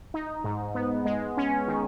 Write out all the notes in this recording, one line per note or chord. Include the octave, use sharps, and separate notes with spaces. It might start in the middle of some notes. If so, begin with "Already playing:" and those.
D#4
G#2
B3
G#3
C#4
D#3